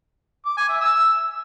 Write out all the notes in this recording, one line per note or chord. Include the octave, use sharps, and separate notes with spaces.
D6
G#5
E5
E6